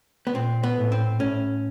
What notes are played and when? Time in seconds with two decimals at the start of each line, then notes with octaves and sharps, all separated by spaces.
0.27 B3
0.35 A#2 C4
0.63 B3
0.77 A2
0.92 C4
1.19 A2 C#4